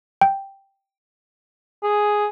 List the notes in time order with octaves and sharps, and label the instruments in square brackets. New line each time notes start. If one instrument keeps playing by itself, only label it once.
[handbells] G5
[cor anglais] G#4